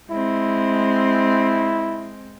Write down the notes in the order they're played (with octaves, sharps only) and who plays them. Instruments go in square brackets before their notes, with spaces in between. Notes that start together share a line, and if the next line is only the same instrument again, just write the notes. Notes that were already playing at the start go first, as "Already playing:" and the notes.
[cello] G#3 C4 [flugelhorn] E4